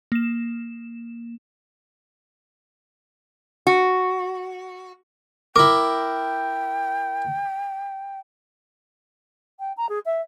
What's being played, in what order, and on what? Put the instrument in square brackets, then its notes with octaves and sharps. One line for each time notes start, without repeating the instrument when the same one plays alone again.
[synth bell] A#3 E7
[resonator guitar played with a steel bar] F#4
[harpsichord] E4 A#4 [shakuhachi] G5 [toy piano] D6
[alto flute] G5
A#5
G#4
E5